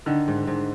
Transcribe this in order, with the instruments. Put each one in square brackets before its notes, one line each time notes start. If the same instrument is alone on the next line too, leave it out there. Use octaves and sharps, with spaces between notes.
[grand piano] D3 [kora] D#3
[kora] G#2
G#2